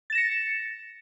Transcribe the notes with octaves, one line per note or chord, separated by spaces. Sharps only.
A6 A#6 C#7 E7